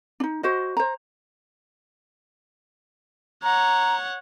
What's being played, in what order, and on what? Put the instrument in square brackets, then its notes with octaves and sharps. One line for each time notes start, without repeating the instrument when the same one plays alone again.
[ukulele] D4 D#4
F#4 C5 D#5
C5 A#5
[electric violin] C#5 F#5 [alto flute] A#5